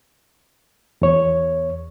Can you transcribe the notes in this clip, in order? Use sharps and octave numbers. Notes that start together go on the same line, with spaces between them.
E2 C#5